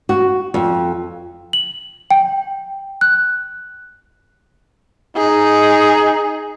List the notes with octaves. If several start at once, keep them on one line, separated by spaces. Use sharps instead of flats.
F#4
F2
F#7
G5
F#6
D#4 G#4